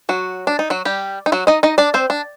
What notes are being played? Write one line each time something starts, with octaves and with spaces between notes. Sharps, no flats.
F#3 F#4
D4
D#4
F#3 F#4
G3 G4
D#4
F#3 F#4
D#4 D#5
D#4 D#5
D4 D5
C4 C5
D4